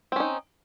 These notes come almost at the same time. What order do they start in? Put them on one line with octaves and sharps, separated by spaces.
C4 C#4 D#4